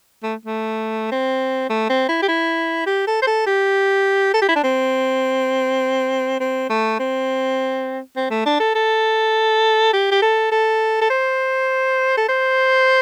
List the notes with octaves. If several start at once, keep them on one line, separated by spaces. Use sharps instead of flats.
A3
A3
C4
A3
C4
E4
G4
E4
G4
A4
C5
A4
G4
A4
G4
E4
D4
C4
C4
A3
C4
C4
A3
D4
A4
A4
G4
G4
A4
A4
A4
C5
A4
C5